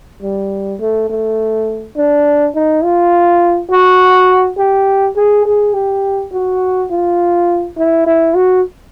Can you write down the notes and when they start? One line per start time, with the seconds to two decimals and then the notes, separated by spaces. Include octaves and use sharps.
0.23 G3
0.81 A3
1.10 A3
1.97 D4
2.55 D#4
2.84 F4
3.70 F#4
4.58 G4
5.16 G#4
5.45 G#4
5.74 G4
6.32 F#4
6.91 F4
7.78 E4
8.07 E4
8.36 F#4